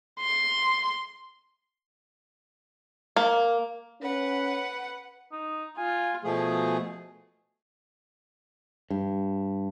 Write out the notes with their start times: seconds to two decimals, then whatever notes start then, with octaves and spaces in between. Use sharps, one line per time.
0.19 C6
3.16 A#3
4.01 C#4 B4 F#5
5.32 D#4
5.77 F4 G#5
6.24 B2 F3 A3 G#4
8.90 G2